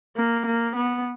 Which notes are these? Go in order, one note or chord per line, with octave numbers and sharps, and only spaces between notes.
A#3
A#3
B3